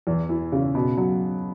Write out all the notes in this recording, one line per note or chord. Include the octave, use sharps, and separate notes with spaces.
E2
E3
C#3
B2
F#3